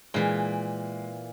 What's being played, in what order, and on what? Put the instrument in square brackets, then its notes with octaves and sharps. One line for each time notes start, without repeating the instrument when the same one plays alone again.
[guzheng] A#2 E3 [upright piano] G#3